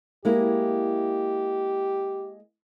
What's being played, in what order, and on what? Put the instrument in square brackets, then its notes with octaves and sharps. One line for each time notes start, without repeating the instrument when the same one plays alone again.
[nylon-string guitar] G#3 A#3 E4 [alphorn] G4